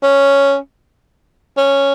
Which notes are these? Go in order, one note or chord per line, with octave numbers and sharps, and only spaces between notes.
C#4
C#4